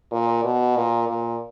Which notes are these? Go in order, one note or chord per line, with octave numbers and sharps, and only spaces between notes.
A#2
B2
A#2
A#2